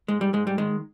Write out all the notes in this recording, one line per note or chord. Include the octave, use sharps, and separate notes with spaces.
G#2 G#3
G3
G#2 G#3
G3
D#3 G#3